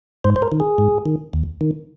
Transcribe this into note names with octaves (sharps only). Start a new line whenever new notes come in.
G#2 C5
C5
A#4
D#3
G#4
G#2
D#3
D#2
D#3